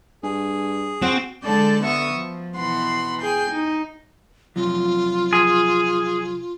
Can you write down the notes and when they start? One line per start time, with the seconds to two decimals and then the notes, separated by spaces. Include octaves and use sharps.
0.23 G2 G#4
1.02 C4 F#4
1.44 D3 G#3 A4 D5 A5 G6
1.83 D3 B3 F#4 E5 C#6 D#6
2.13 F3
2.57 B2 E3 F#5 B5 C6
3.22 G#4 G5 G#5 G6
3.51 D#4
4.56 C3 F3 F#3 F4
5.33 G#4